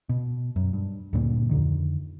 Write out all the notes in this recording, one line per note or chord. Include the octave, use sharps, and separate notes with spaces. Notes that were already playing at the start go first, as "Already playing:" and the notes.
B2
F#2
G2
D2 G2 A#2
F2 D3 D#3